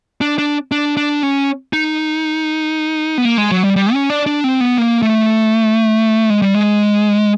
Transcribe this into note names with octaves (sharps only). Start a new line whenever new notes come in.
D4
D4
D4
D4
C#4
D#4
B3
A#3
G#3
F#3
G3
G3
C#4
D4
D4
C4
B3
A#3
A3
G#3
G3
G#3